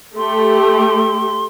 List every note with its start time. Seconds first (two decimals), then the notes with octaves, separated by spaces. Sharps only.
0.17 A3 G4 C6